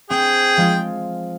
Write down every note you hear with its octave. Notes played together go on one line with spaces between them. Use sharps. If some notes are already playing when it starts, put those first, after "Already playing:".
C4 G#4 G5
F3 G#3 F4